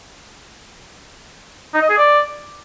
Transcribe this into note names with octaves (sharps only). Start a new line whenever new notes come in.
D#4
D#5
G#4
D5